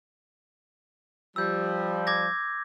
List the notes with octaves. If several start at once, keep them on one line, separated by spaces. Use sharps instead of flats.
F3 G3 E6 G6
D6 G#6 A#6